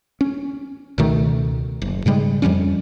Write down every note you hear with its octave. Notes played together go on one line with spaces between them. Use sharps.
C#4
C#2 B2 D#3 A3
F#1
G#2 C#3 G3 G#3
F2 F3 G3 C#4